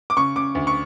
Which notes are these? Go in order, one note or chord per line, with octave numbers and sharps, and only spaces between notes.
D6
C#3 C#6
C#3 D6
D2
C#6